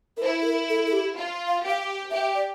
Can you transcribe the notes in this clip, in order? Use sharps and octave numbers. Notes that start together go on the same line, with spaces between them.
A#4
E4 C5
A4
A#4
A4
A4
G4
F4
F5
G4 F5
G4 E5
D5